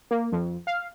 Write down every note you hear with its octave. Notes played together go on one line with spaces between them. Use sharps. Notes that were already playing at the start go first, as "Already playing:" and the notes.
A#3
F2
F5